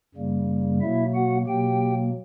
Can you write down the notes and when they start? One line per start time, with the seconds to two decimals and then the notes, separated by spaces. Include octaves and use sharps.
0.15 F#2 C#3 G3 A#3
0.81 B2 F#3 A#3 E4 E5
1.15 F#4 F#5
1.47 B2 F#3 A#3 G4 G5